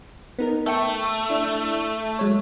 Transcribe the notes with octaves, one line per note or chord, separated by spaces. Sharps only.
B3 D#4 A#4
A3 E5 G5 C#6
D4 E4
F#3 G#3 C#5